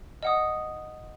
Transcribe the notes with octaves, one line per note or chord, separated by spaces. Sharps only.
D#5 F#5 D#6